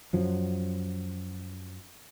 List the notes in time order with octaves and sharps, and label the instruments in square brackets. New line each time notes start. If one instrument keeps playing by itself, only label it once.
[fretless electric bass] F#2 F3 F#3